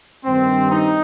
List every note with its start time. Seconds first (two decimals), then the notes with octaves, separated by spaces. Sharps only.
0.25 G2 D#3 C4
0.70 D#4